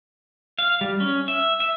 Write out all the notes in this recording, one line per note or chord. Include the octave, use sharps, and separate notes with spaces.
F5
G3
C#4
E5
E5